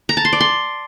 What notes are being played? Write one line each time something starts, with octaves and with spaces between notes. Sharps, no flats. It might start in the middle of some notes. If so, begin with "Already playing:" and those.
A#5
A5
C6
D5
C6